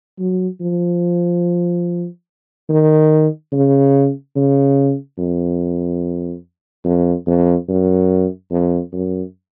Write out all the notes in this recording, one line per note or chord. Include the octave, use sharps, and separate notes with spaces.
F#3
F3
D#3
C#3
C#3
F2
F2
F2
F#2
F2
F#2